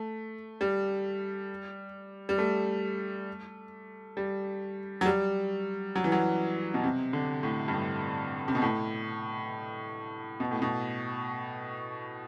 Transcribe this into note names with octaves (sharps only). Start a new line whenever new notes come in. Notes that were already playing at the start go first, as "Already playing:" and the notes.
Already playing: A3
G3
G3
A3
G3
F#3
G3
F#3
E3
F#3
B2
C3
D3
A2
G2
A2
C3
B2
A2
B2
A2
B2